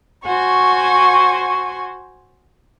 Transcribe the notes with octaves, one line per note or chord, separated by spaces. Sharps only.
F#4 C5 G#5 C#6